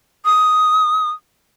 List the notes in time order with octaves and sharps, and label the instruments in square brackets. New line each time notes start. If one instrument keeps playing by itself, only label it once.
[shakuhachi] D#6